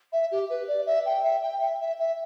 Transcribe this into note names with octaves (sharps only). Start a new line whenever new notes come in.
E5
G4
B4
D5
E5
G5
E5
G5
E5
E5
E5